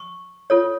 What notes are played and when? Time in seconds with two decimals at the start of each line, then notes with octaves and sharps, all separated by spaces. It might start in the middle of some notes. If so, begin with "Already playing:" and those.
Already playing: C#6
0.50 F4 A4 C#5